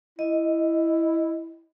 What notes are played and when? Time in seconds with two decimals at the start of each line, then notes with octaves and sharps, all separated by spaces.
0.19 E4 D#5